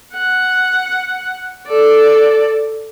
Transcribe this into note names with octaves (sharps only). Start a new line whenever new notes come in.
F#5
A4 D5